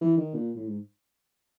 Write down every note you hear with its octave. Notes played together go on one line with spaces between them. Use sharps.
E3
D#3
A#2
A2
G#2